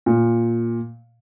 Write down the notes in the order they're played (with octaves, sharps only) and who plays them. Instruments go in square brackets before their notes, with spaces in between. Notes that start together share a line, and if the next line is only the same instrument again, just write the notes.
[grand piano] A#2